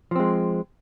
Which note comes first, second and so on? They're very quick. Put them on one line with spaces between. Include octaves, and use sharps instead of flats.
F3 C4 G#3